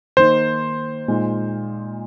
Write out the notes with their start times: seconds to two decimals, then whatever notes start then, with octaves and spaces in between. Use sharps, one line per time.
0.17 D#3 A#3 D#4 C5
1.08 A#2 G#3 D#4